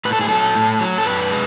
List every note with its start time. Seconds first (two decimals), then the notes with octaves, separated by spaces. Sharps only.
0.05 A2 B4
0.13 A4
0.21 G#4
0.28 F#3 A4
0.55 A2
0.81 F#3
0.98 A4
1.06 F#2 B4
1.31 G#3